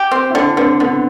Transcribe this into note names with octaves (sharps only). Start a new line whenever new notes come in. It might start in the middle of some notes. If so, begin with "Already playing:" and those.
Already playing: G4
C4
E4
D3 D4
D3 C4
D3 B3